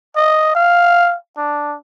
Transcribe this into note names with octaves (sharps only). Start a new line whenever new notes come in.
D#5
F5
D4